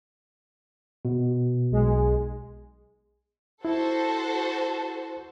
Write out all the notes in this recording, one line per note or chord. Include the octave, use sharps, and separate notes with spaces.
B2
B1 G#3
E4 F#4 A4 C5